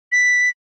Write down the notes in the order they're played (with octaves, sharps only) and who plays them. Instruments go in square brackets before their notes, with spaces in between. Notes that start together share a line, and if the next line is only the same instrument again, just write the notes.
[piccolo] B6